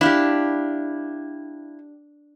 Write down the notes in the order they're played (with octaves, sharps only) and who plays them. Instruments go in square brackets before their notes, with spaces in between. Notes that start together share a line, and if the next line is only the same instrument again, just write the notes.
[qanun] D4 G4 [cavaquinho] E4 F5